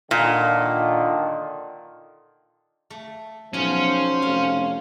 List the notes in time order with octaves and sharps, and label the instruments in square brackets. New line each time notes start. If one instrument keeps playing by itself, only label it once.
[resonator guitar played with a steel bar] A#2 [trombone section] D3 D#3 F4
[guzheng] A3
[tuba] B1 [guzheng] F3 F#3 [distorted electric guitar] C#4 [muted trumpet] C5
[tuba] F1 [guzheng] F4